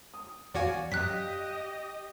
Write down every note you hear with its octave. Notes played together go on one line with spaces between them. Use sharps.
D#6
E2 F#4 D5 F5 G#5
F#2 G4 D#5 F#6 B6